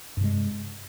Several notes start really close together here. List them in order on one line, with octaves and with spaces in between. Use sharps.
G2 C3 G#3